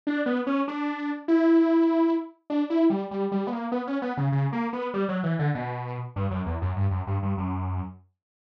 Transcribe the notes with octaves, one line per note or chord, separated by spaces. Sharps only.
D4
B3
C#4
D4
E4
D4
E4
G3
G3
G3
B3
A#3
B3
C#4
B3
C#3
C#3
A#3
B3
G3
F#3
E3
D3
B2
G2
F#2
E2
F#2
G2
F#2
G2
G2
F#2